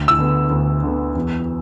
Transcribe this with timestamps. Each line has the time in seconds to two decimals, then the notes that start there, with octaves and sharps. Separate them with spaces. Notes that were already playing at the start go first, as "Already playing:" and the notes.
Already playing: D2
0.08 E6
0.18 D3 B3
0.51 D2
0.83 D3 B3
1.15 E2